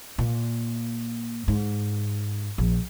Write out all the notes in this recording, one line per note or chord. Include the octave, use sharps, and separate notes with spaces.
A#2
G#2
A#1